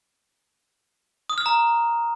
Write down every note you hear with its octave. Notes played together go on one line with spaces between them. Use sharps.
D#6
F6
A#5